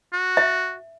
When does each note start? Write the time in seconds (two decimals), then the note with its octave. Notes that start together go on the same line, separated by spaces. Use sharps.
0.13 F#4
0.37 E5